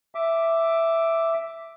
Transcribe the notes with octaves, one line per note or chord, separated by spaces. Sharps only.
E5 D6